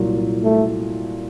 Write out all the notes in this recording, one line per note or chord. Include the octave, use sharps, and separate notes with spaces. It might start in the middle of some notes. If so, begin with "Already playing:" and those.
Already playing: C2 A#2 F#3
A3